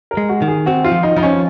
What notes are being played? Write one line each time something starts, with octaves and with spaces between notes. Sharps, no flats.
A#4
G#3
F#4
D#3
G#4
C4 F#4
F4
F3
D#4
F3 D#4
C#4